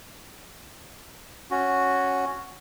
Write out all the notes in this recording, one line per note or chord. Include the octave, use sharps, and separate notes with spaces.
C#4 F#4